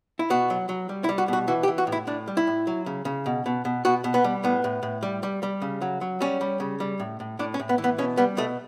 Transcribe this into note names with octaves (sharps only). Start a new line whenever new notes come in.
E4
B2 F#4
F#3
F#3
G3
E4
G3
F#4
B2 F#4
E3 F#4
G4
E3
F#4
A2
E4
A2 D4
G3
E4
A2
F#3
C#3
C#3
B2
B2
B2
B2 F#4
B2
B3
G3
A2 B3
A2
A2
G3
G3
G3
C#3
F#3
F#3
G3 C#4
G3
C#3
G3
A2
A2
A2 D4
C#4
A2
B3
E3
B3
B2 C#4
G3 B3
B2 A3